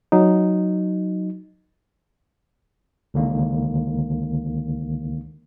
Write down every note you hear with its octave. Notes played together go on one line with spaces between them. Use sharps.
F#3 D#4
C#2 D3 D#3 A#3